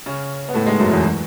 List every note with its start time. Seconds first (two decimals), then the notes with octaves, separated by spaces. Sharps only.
0.06 C#3 C#4
0.48 B3
0.54 A2 A3
0.66 G#2 G#3
0.80 F#2 F#3
0.91 E2 E3
1.04 F#3